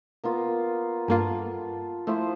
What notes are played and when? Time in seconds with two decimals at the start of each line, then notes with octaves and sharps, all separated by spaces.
0.24 A#3 B3 F4
1.08 G2 A#3 F4 A4
2.07 F3 A3 E4 C5